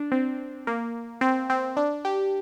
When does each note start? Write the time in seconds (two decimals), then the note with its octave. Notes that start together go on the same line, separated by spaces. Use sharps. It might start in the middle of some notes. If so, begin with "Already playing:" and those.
Already playing: D4
0.12 C4
0.67 A#3
1.21 C4
1.50 C4
1.77 D4
2.05 G4